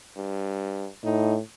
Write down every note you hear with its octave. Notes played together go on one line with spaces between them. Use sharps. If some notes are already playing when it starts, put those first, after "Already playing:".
G2
A2 D#4